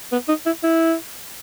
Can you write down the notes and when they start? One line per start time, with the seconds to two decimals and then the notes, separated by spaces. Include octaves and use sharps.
0.12 B3
0.28 D#4
0.46 E4
0.63 E4